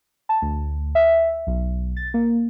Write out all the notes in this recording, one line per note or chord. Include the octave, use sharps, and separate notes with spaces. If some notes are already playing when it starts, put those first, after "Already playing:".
A5
D2
E5
B1
A6
A#3